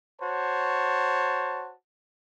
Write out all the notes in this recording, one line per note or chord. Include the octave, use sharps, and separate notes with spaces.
F#4 C5 C#5 A5